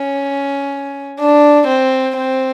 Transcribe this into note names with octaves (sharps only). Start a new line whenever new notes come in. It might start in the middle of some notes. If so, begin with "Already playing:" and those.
Already playing: C#4
D4
C4
C4